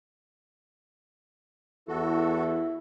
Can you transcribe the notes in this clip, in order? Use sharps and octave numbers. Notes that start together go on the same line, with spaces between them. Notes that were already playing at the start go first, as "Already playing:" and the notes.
E2 E4 F#4 A4